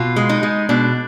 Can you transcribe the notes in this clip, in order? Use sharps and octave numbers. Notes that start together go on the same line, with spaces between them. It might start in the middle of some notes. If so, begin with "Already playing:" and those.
Already playing: B2 F4
G#3
D#4
G#3
B2 D4